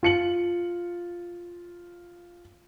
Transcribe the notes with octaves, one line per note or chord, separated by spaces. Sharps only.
F4 C#7 F#7